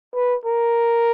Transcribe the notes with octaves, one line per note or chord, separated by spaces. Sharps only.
B4
A#4